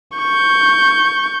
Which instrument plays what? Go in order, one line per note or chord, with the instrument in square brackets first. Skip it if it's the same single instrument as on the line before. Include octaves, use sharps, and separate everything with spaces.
[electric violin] C#6 G6